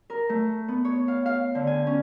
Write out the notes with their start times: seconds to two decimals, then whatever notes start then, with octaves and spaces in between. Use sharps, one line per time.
0.10 A#4
0.29 A3
0.68 B3
0.85 C#5
1.08 F5
1.26 F5
1.55 D3
1.67 G#5
1.87 C#4